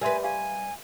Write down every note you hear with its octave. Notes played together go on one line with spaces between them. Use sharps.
G3 A#4 B4 E5 G#5 C6
G4 F5 G#5